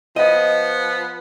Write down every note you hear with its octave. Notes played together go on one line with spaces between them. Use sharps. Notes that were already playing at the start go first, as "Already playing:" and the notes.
F3 B3 D#5